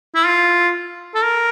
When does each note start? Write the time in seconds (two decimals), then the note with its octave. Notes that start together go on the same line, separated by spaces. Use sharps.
0.15 E4
0.27 F4
1.15 A4
1.23 A#4